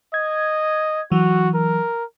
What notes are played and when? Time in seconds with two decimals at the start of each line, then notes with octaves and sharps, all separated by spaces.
0.14 D#5 G#6
1.12 E3 F#3 F#4
1.54 A#4